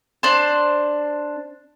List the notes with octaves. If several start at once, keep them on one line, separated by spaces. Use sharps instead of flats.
D4 C5